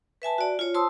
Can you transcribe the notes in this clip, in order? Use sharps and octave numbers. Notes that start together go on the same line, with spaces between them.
B4 E5 G#5 A5
F#4 D5
F4 C#5
C5 A5 C6 D#6 E6